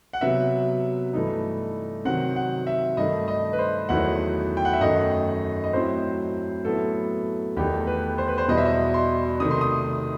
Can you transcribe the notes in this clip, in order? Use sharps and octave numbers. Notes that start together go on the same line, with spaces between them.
F#5
C3 F#3 B3 E5
G2 E3 A3 D#4
C3 D#3 F#3 C4 F#5
F#5
E5
G2 D#3 A3 D#5
D#5
B4
C5
E2 D#3 F#3 A3 E4 F#5
G5
F#5
E5
F#2 D#3 A3 D#4 D#5
D#5
A2 F#3 C4 E4 C5
A2 F#3 B3 E4 A4
E2 D#3 A3 D#4 G4
B4
C5
B4
C5
E2 B2 G3 D#5
E5
D#5
C6
C3 D#3 A3 D#6
C6
D#6